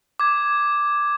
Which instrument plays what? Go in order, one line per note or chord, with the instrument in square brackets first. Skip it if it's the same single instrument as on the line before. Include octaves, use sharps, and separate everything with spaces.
[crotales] D6 G#6